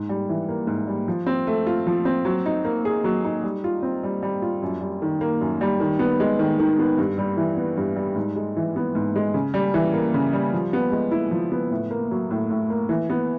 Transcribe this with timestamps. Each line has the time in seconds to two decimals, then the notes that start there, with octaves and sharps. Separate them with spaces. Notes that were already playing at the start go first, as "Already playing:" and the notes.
Already playing: G#2
0.09 G3
0.29 E3
0.49 A#3
0.67 G#2
0.87 G3
1.08 F3
1.26 C4
1.47 A3
1.67 F4
1.87 F3
2.05 C4
2.25 F#3
2.46 D#4
2.65 A#3
2.85 G#4
3.04 F#3
3.24 D#4
3.43 G3
3.64 F4
3.83 C4
4.03 G3
4.23 G3
4.42 F4
4.62 F#2
4.81 G3
5.02 D#3
5.21 A#3
5.41 F#2
5.61 G3
5.80 D#3
5.99 B3
6.20 G#3
6.39 D#3
6.59 D#3
6.79 B3
6.98 G2
7.18 G3
7.37 E3
7.57 B3
7.77 G2
7.96 G3
8.16 G#2
8.36 G#3
8.57 E3
8.76 B3
8.95 G#2
9.16 G#3
9.34 C#3
9.54 G3
9.74 E3
9.94 A#3
10.14 C#3
10.33 G3
10.54 F3
10.73 B3
10.92 G#3
11.11 E4
11.31 F3
11.52 B3
11.71 A2
11.91 A#3
12.11 F#3
12.31 A2
12.50 A2
12.70 A#3
12.89 E3
13.10 B3